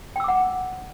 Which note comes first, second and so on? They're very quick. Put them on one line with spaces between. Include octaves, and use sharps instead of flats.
G5 E6 D6 F#5